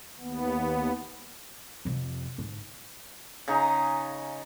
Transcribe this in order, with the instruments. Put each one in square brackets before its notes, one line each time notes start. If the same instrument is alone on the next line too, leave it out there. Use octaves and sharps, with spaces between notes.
[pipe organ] D#2 B3
[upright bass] F2 C3
G#2 D3
[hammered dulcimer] C#3 D#4 G#5 A#5